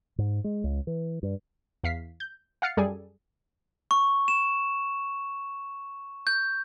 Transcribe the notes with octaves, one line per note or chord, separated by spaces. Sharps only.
G#2
G#3
C#2
E3
G2
E2 F5 B6 C7
G6
F5 F#5 F6 A6 C7 C#7
F#2 G3 G#4 A4 D5 G#5
C#6
E7
G6